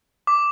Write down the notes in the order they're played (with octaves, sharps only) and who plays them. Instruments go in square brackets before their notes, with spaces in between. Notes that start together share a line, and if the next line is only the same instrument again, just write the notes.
[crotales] D6